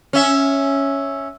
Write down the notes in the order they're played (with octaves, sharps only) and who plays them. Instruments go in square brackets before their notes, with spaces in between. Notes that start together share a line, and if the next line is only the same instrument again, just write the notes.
[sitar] C#4 E5